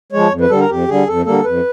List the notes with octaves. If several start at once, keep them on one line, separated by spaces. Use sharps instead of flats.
F3 G#3 C#5
F2
B4
D3 G3 A4
A#4
F2 G4
D3 G3 G#4
F2 A4
D3 G3 A#3 A4
F2 B4